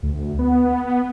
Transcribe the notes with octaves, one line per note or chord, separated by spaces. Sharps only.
D2
B3